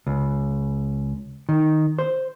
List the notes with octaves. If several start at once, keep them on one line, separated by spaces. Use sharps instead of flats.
C#2
D#3
C5